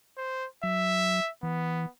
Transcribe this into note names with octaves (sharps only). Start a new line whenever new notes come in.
C5
F#3 E5
E3 B3